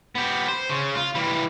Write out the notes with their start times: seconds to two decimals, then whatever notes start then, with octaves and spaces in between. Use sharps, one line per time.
0.15 B3 G4
0.48 C5
0.70 C#3
0.95 F4
1.15 E3 G3